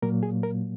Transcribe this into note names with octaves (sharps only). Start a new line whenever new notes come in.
A#2 F#3 A#3 A#4
G#4
A#4